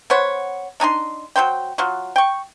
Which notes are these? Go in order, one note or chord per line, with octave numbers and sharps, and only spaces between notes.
B3 C5 C#5 F#5
D4 D#4 G#5 C6
F#3 D4 C5 G5
F#3 F4 F#4
G5 C#6